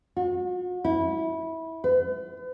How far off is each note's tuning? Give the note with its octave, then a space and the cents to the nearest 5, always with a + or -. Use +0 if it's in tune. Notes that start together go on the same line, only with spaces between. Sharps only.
F#4 -40
E4 -20
B4 +40